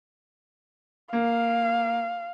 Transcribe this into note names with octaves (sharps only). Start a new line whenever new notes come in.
A#3 F5